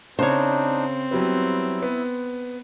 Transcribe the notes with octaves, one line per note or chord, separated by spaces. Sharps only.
C#3 C4 D4 D#4 C5 C#5
F#3 G3 B3 E4
B3